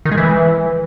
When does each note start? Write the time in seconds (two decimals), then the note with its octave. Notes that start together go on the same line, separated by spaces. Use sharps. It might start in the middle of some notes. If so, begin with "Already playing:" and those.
0.05 D#3
0.11 G#3
0.17 E3